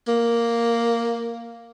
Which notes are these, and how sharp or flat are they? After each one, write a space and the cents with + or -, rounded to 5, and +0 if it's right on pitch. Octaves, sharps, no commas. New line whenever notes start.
A#3 +0